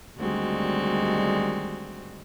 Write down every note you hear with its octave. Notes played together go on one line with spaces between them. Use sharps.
D2 D#3 G3 G#3 C4 F#4